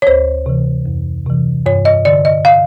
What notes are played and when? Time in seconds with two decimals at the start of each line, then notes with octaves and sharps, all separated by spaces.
0.02 C#5
0.07 D2 C5
0.46 C3 E3
0.86 F2
1.26 C3 E3
1.66 G2 C#5
1.85 D#5
2.05 D3 D5
2.25 D#5
2.45 F5